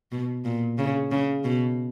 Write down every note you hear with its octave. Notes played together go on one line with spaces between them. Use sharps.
B2
A#2
C#3
C#3
B2